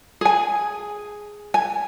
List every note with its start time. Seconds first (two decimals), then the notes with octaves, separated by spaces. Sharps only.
0.21 G#4 G#5
1.54 G#5